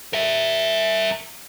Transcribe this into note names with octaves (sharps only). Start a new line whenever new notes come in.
A#4 E5